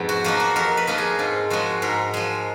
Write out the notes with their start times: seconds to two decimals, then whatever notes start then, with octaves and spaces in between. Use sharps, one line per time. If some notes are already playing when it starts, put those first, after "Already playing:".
Already playing: F2 G#2 B3
0.09 F#4
0.24 F3 A#3 D#4 F#4
0.40 F#4
0.56 F2 A#4
0.77 B4
0.87 F3 A#3 D#4 A#4
0.98 G#4
1.19 G#2 F4
1.50 F3 G#3 F#4
1.82 G#2 A#4
2.14 F3 G#3